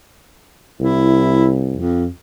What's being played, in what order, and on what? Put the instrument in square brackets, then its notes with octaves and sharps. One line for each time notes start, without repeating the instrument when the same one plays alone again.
[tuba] C2 [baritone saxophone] E4
[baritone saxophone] F2